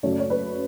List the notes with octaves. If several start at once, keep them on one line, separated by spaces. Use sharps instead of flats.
F#2 C#3 F#3 A3 C#5
D5
C#5
B4